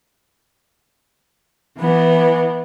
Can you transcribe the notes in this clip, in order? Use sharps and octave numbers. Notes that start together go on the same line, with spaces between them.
E3 B3